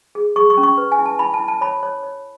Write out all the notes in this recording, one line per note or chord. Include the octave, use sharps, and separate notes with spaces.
G#4
G#4 C#6
C#6
C#4
C#6
B4
G#5
E4
A5
E4 B5
A5
E4
A5
C#5 B5
C#5
C#5